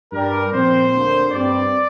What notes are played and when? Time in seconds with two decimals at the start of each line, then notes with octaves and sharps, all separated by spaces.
0.12 G2 G3 D4 A#4
0.52 A#2 F3 C4 C5
0.92 D2 D3 A#3 D4
1.32 G2 G3 C4 D5